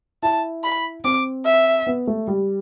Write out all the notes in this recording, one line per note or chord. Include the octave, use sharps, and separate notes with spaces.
E4 A5
B5
C4 D6
E5
B3
A3
G3